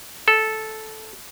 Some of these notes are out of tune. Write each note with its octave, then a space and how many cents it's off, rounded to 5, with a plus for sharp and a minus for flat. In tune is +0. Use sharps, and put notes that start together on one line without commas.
A4 -10